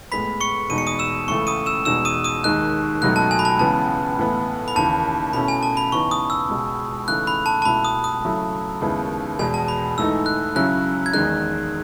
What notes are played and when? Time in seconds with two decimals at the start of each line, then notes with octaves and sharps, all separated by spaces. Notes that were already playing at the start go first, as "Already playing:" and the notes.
0.12 A2 G#3 B3 B5 B6
0.41 C#6 C#7
0.70 E2 B2 G#3 D#4 D#7
0.78 C#7
0.87 D#6 D#7
0.99 E6 E7
1.28 C#2 C#3 E3 A3 C#6 C#7
1.47 D#6 D#7
1.66 E6 E7
1.85 E2 B2 G#3 D#4 E6 E7
2.05 D#6 D#7
2.24 D#6 D#7
2.44 D#2 D#3 G#3 D#4 F#6
3.02 C#2 B2 F#3 A3 D#4 F#6
3.16 A5
3.31 G#5
3.39 B5
3.45 A5
3.59 C#2 C#3 E3 B3 A5
4.18 A2 E3 B3 E4
4.68 B5
4.75 D#2 C#3 E3 A5
5.33 B2 A3 C#4 E4 B5
5.48 G#5
5.63 A5
5.77 B5
5.92 C#3 E3 B3 D#4 C#6
6.11 D#6
6.30 E6
6.49 C#2 B2 G#3
7.08 C#3 E3 A3 D#4 F#6
7.27 B5
7.46 A5
7.62 A5
7.65 C#2 B2 A3 E4 B5
7.85 D#6
8.04 D#6
8.24 C#3 F#3 A3 E4
8.81 D#2 C#3 G#3 B3 E4
9.39 E2 B2 G#3 G#5
9.54 A5
9.68 B5
9.98 G#2 E3 A3 D#4 E6
10.26 F#6
10.55 C#3 F#3 C#4 E4 F#6
11.06 G#6
11.13 E2 D#3 G#3 D#4 F#6